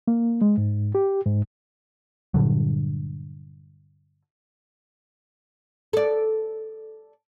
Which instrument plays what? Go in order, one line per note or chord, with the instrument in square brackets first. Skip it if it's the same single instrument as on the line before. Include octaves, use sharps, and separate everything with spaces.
[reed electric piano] A#3
G#3
G#2
G4
G#2
[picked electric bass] G2 A#2 D3 F#3
[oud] A4 D5